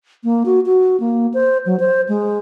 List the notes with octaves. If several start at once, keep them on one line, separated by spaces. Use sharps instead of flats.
A#3
F#4
F#4
A#3
C5
F#3
C5
G#3